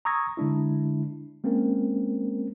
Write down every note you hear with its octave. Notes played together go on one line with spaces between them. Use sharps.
A#5 C#6 D#6 E6 G#6 A#6
D3 G#3 D4 E4
G#3 A#3 C4 C#4 A#4